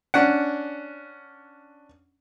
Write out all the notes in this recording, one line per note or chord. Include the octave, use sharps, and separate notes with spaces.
C#4 D4 F#5